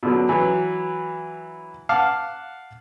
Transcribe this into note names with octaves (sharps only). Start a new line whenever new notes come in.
B2 D3 F#3
E3 F#3
F5 F#5 A5 D6